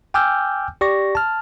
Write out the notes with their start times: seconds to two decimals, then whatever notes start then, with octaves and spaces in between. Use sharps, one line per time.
0.14 G5 G#5 D6 E6 F6 G6
0.81 G4 D5 C#6 A#6
1.15 A5 F6